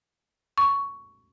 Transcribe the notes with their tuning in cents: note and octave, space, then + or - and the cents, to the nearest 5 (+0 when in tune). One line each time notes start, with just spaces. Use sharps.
C#6 +10